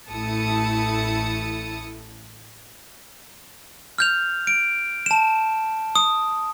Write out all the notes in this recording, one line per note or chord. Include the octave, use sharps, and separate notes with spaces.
A1 A3 E4 A5 D#6 C#7
F6 G6 F7
D7
A5 E7
D#6